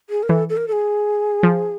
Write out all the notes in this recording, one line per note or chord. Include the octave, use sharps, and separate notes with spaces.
G#4
A#4
E3 A4
A4
A#4
A4
G#4
F3